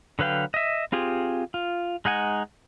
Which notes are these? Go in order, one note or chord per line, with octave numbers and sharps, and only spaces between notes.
D3 F#3 B4 F5 G5
D#5 E5
C4 F4 G4 G#4
F4
G#3 D#4 F#5 G#5